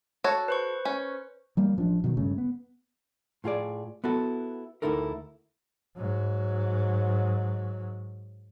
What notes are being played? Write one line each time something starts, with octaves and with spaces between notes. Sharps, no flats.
F#4 A4 C#5
B4 C5 C#6
C#4
F#3 G3 A#3
A1 F3 C#4 D4
B2 D#3 F#3
G1 G2 C#3 A3
B3
A2 F4 G#4 D5
B3 E4 F#4 A4
D2 B2 D#4 E4 A4 A#4
G#2 F#3